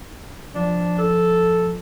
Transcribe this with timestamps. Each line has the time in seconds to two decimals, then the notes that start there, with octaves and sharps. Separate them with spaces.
0.55 F3 D4
0.99 A4